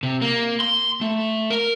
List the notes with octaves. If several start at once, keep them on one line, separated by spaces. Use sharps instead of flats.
C3
A#3
C6
A3
A#4